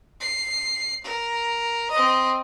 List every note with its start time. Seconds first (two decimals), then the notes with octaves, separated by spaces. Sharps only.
0.21 C7
1.04 A#4
1.91 C4 D#5